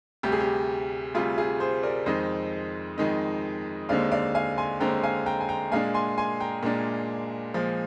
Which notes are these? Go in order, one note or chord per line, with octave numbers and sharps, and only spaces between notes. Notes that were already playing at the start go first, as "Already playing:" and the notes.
D2 C3 G3 G4
G#4
G4
D2 C3 G3 F4 G#4
F4 G#4
G#4 C5
A#4 D5
F2 D#3 G#3 D#4 C5 D#5
F2 D#3 G#3 D#4
D#2 D3 G#3 C4 D5 F5
D5 F5
F5 G#5
G#5 C6
D#2 D3 G#3 C4 G5 A#5
F5 G#5
G5 A#5
G#5
G5 A#5
A#2 G#3 D4 F5 G#5
G#5 C6
G#5 C6
G5 A#5
A#2 G#3 D4
A#2 F3 G#3